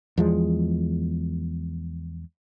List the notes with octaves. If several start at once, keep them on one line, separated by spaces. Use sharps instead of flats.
E2 F3 G#3